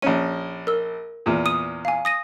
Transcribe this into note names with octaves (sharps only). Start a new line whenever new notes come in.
A#1 C#4 D#7
A#4 E6
E2 A#2
D#6 D#7
F5 G#5
D#6 A#6 D#7